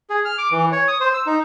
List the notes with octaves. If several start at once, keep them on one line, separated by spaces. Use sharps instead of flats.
G#4
F6
D6
E3
C#5
D#6
C5
E6
D#4